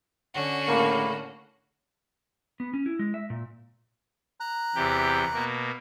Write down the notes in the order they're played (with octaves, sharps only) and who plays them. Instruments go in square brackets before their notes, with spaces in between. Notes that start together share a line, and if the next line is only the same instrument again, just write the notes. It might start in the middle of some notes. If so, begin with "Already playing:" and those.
[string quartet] D3 C#4 F#4
[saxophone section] A2 C#3 A#3
[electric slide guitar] B3
C#4
E4
G#3
E5
A#2
[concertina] A#5 F#6
[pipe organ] E2 C3 G4
B2 A#3